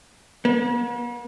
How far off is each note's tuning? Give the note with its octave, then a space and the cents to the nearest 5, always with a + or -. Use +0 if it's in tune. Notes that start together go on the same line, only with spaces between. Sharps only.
B3 -45